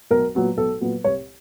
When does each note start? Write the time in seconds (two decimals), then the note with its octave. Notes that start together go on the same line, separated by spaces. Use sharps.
0.11 B1 A#4
0.35 A#2 F#3 B3
0.57 B1 A4
0.81 A#2 F#3 B3
1.04 C2 C#5